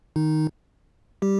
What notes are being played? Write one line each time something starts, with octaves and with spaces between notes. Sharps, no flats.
D#3 D#4
G3 G4